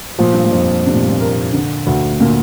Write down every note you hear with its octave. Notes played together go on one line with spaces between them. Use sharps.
A#2 F3
G2
A#2
F2
C3 D4
A#2
G2
A#2
A#4
D3
D2
A#2 D3 A#3